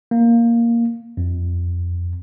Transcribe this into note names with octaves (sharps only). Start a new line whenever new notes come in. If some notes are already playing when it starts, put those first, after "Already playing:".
A#3
F2